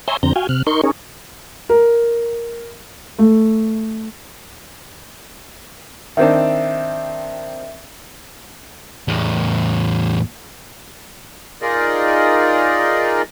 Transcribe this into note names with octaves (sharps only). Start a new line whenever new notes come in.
C#5 E5 G#5 A#5 C6 G6
F2 D3 C4 A#5 G6
F#4 F5 G5 G#5
C3 F6 F#6
D#4 A#4 C6 C#6 G6
C#4 D#4 G#4 A#4 C#5
A#4
A3
D#3 C4 D4 E5
E2 A2
D#4 F4 G#4 A#4 D5 D#5